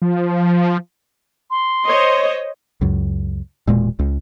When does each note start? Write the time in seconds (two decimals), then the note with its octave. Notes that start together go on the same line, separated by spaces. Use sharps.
0.02 F3
1.50 C6
1.87 C5 C#5 D#5
2.81 C#2 F#2
3.67 E1 A#2 G#3
3.99 C#2